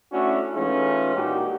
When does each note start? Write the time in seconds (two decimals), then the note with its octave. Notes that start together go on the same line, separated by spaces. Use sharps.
0.12 A3 C#4 D4 E4 F#4
0.55 E3 G#3 A3 C#4 D#4 F4
1.16 G2 A#2 D#3 D#4 F#4 G4